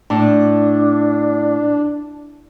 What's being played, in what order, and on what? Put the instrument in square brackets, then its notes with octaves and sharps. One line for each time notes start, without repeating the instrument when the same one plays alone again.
[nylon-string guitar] A2 [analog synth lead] D4